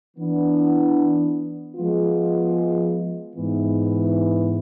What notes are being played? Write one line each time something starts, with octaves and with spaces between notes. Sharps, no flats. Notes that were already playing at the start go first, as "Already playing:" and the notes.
E3 B3 D4
F3 G#3 B3 F4
G#2 E3 B3